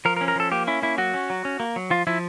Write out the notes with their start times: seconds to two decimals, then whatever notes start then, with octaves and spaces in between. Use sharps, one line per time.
0.05 F3 A#4
0.17 A#4
0.21 C#4
0.28 A#4
0.36 F3 A4
0.52 A#3 G4
0.67 C#4 E4
0.82 A#3 E4
0.98 F#3 F#4
1.14 C#4
1.30 F#3
1.45 C#4
1.60 A#3
1.76 F#3
1.90 F3 F4
2.07 F3 E4